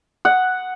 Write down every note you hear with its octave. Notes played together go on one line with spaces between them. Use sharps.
F#5